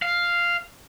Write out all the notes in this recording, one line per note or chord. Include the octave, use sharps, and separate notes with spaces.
F5